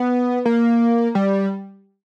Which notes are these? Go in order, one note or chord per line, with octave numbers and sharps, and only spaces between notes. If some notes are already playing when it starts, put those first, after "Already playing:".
Already playing: B3
A#3
G3